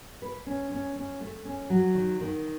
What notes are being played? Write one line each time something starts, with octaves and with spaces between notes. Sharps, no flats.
B4
C#4
C#4
C#4
A3
C#4
F#3
D#3
D#3